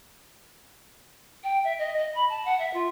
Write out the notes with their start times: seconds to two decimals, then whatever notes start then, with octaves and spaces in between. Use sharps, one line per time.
1.43 G5
1.64 E5
1.78 D#5
1.97 D#5
2.14 B5
2.28 A5
2.45 F#5
2.59 E5
2.73 F4